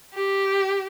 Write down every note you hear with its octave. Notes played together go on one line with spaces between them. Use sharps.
G4